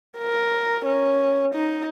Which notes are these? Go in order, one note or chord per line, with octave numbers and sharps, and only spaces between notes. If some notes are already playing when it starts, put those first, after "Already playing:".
A#4
C#4
D#4